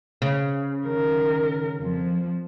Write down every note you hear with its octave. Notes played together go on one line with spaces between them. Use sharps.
C#3
D#3 A#4
F2 F3